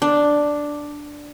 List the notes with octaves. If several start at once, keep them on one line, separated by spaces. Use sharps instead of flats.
D4